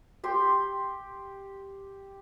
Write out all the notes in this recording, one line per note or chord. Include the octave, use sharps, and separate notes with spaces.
G4 G5 C6